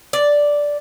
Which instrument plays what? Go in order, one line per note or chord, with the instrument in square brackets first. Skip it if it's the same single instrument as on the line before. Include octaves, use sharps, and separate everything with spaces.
[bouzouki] D5